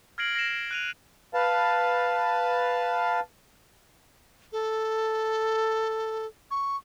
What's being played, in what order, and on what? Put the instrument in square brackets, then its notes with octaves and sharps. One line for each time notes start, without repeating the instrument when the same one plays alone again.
[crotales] F6 G#6 A#6 C7 D7 F#7
A#6 C7 E7
A#6
F#6 D#7 F7
[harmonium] B4 F5 A5
[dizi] A4
C#6